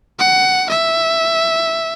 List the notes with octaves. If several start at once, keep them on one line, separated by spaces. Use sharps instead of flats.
F#5
E5